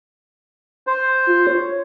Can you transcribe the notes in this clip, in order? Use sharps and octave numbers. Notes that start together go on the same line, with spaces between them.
C5
F4
C#5